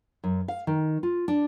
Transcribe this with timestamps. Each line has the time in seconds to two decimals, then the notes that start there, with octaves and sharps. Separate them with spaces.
0.24 F#2
0.48 F5
0.67 D#3
1.03 F4
1.28 D4